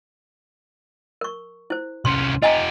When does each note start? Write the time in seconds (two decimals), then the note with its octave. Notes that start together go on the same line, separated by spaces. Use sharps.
1.21 A#4 C#6
1.70 E4 C5
2.05 C2 C#4 C6
2.42 F4 G4 D#5 G#5 A#5